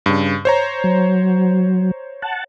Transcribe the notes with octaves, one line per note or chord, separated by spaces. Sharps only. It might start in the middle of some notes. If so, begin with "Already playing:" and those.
G2 C#3
C5 C#5 A#5
F#3
F#5 A5